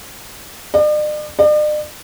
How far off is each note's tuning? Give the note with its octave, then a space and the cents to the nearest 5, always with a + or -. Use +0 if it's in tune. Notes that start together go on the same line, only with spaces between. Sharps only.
D5 +45
D5 +45